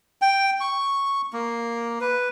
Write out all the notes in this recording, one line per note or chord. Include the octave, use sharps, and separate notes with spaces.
G5
C#6
A#3
B4